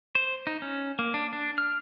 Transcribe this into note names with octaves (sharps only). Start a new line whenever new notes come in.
C5
D#4
C#4
A#3
D4
D4
F6